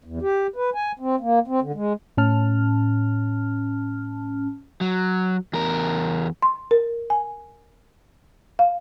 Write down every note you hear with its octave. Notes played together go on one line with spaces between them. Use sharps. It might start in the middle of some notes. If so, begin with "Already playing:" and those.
E2
G4
B4
G#5
C4
A#3
C4
D3
G#3
A2 C#4 A5 F6
F#3
E2 A#4
C6
A#4
G#5
F5